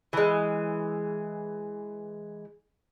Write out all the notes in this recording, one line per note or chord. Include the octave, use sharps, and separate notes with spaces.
E3 G#3